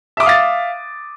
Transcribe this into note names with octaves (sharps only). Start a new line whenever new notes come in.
E5 F5 D6 D#6 A6